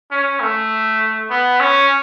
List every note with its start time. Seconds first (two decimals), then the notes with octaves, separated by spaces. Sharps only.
0.11 C#4
0.40 A3
1.30 B3
1.60 C#4